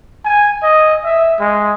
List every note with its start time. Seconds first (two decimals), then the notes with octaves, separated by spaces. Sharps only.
0.25 G#5
0.63 D#5
1.05 E5
1.40 G#3